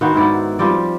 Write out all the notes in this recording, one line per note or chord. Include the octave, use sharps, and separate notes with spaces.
D#3 B3 F#4 C5
G#2 D#3 E4 D5
F3 G3 C4 D5